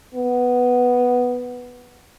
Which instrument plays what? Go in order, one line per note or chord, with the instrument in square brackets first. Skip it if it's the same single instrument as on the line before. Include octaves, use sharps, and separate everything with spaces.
[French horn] B3